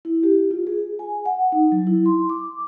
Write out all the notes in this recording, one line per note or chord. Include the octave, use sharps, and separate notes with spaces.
E4
G4
F4
G#4
G#5
F#5
D#4
F#3
E4
C6
D6